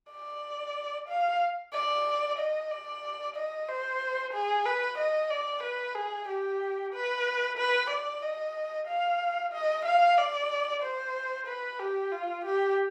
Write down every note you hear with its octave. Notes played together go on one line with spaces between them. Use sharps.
D5
F5
D5
D#5
D5
D#5
C5
G#4
B4
D#5
D5
B4
G#4
G4
B4
B4
D5
D#5
F5
D#5
F5
D5
C5
B4
G4
F4
G4